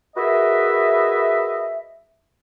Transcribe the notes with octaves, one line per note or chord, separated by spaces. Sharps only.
F#4 G#4 A#4 B4 D#5 E5